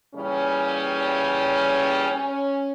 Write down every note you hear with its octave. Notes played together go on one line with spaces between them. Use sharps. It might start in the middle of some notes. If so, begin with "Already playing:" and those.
A#2 C#3 E3 G3 C#4
C#4